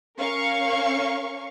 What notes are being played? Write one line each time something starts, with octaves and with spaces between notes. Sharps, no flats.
C#4 A#4 F5 C#6